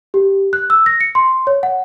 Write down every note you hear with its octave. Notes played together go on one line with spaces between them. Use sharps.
G4
F#6
E6
A#6
C#7
C6
C#5
F#5